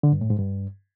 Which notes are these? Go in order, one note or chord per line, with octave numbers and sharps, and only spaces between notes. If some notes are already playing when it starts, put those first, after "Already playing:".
D3
G2
A2
G#2
G2